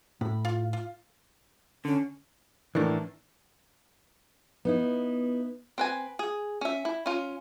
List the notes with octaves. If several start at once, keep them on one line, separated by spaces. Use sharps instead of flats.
A2 B5
F4
F4
D3 C#4
A2 D#3 E3 A#3 D4
B3 D#4 E4
C4 B4 G#5
G#4
C#4 E5
E4
C#4 F4